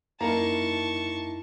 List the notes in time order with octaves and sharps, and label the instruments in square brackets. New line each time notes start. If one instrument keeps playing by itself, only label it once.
[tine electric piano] F#2 D#4 E4 [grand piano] A#3 A#5 [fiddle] A5 C#6